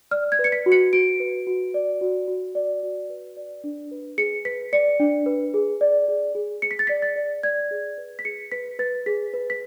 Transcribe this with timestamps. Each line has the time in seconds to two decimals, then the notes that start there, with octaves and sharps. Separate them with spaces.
0.11 D5 F6
0.32 G#6
0.39 B4
0.44 C#7
0.52 B6
0.66 F#4
0.72 C#7
0.93 F#4 D7
1.20 B4
1.47 F#4
1.74 D5
2.01 F#4
2.28 F#4
2.55 D5
2.83 F#4
3.10 B4
3.37 D5
3.64 D4
3.91 B4
4.18 G#4 C#7
4.45 B4 B6
4.73 D5 C#7
5.00 D4
5.26 B4
5.54 G#4
5.81 D5
6.08 G#4
6.35 G#4
6.62 G#4 C#7
6.71 B6
6.79 A6
6.87 D5 B6
7.02 A6
7.16 D5
7.43 D5 G#6
7.71 G#4
7.98 B4
8.19 B6
8.25 G#4 C#7
8.52 B4 B6
8.79 B4 A6
9.06 G#4 B6
9.34 B4
9.50 B6